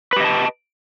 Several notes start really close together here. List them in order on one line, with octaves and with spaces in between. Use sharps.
B4 G4 D#5 A5